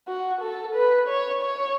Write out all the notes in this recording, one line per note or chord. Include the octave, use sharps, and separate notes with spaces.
F#4
A4
B4
C#5
C#5